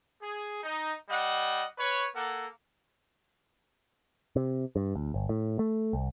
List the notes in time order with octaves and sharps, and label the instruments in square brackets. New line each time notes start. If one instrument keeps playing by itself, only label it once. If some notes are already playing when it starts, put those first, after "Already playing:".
[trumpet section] G#4
D#4
G3 D#5 F#5
B4 C#5
A#3 A4 F#5
[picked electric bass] C3
G2
D2
G1
A2
A3
C2